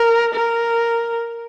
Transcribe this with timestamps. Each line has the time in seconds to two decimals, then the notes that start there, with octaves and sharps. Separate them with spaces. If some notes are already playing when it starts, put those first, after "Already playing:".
Already playing: A#4
0.34 A#4